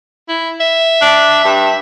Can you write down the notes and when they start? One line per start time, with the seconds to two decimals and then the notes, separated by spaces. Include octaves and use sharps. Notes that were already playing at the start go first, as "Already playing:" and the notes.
0.29 E4
0.60 E5
1.01 D4
1.44 G2